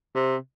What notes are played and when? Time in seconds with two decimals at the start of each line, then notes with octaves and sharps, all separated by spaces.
0.15 C3